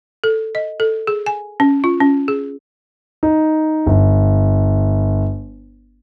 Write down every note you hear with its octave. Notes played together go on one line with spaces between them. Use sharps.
A4
D#5
A4
G#4
G#5
C#4
F4
C#4
G#4
D#4
G1